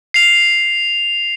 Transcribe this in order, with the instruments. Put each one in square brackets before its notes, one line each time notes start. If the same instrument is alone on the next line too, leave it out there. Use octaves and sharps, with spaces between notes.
[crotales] C7 F7